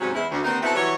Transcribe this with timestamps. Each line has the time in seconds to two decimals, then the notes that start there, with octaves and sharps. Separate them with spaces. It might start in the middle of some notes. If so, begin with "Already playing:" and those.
0.01 G#2 C3 F#3 G3 C#4
0.14 E2 G#3 E4
0.31 D2
0.44 D#2 B3 C4 D4 D#4
0.62 B3 C4 D#4 E4 F#4 A4
0.75 E3 F#3 G3 C#5